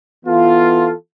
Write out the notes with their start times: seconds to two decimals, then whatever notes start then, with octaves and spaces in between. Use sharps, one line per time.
0.24 E3 B3 F4 A4